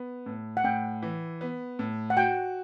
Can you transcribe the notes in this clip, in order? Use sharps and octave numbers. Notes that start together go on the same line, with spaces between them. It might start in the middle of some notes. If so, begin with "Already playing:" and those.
Already playing: B3
A2
F#5
A2 G5
E3
B3
A2
F#5
F#4 G5